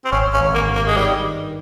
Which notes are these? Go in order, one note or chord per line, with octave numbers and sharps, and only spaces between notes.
C4
G#1 C#4
C#4
G#1
A#3
G2
A#3
G#3
D#3 G3